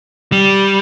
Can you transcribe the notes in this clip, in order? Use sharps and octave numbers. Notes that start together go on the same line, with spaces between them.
G3